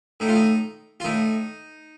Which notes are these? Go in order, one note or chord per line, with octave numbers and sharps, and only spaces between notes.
A2 D#4
F4
D#4
F4
A2 D#4